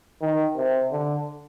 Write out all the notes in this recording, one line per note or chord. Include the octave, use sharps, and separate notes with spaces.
D#3
C3
D3